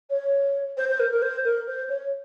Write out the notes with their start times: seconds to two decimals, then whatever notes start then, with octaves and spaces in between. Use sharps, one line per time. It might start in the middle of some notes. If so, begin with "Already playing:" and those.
0.10 C#5
0.77 C5
0.89 C5
1.00 A#4
1.11 A#4
1.22 C5
1.45 A#4
1.67 C5
1.89 C#5